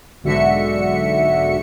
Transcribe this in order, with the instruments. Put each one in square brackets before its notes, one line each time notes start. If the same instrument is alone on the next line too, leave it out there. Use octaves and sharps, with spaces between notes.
[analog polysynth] B1 G#2 D3 F#4 E5 C#7